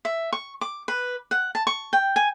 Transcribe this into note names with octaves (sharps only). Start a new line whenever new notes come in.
E5
C#6
D6
B4
F#5
A5
C#6
G5
G#5